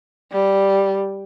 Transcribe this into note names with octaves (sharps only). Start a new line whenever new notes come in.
G3